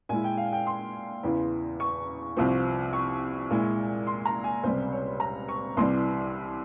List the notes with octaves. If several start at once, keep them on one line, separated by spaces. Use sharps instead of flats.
A#2 G#3 E4 G#5
G5
F5
G5
C6
E2 C#3 E3
C#6
C2 C3 F3 C4
C#6
A#2 G#3 E4
C6
A#5
G#5
C#2 C3 G3 C5
C#5
A#5
C#6
C2 C3 E3 G3 C6